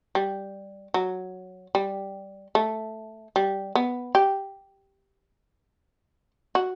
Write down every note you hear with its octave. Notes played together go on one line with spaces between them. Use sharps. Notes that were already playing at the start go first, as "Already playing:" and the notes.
G3
F#3
G3
A3
G3
B3
G4
F#4